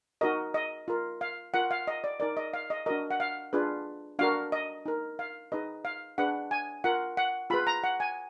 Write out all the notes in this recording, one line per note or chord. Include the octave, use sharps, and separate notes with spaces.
D#4 F#4 A#4 D#5
D#5
F4 A#4
F5
F4 A#4 F#5
F5
D#5
D5
D#4 A#4 D5
D#5
F5
D#5
D4 F#4 A#4 D#5
F#5
F5
D4 F4 G#4 B4
D4 F#4 A#4 F5
D#5
D#4 A#4
F5
D#4 G#4 B4 D#5
F5
D4 G#4 B4 F#5
G#5
F4 A#4 F#5
F#5
F4 G#4 B4 B5
A#5
F#5
G#5